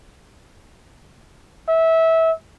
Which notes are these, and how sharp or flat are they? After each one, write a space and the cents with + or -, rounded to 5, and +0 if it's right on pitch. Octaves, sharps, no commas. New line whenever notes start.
E5 -20